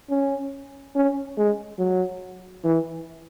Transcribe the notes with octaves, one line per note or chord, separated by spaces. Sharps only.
C#4
C#4
G#3
F#3
E3